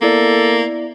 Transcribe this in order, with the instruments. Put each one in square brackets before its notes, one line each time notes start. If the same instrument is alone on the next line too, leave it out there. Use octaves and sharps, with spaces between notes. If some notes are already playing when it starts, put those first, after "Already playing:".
[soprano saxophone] A#3 [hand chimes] B3 E4 D5 [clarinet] A4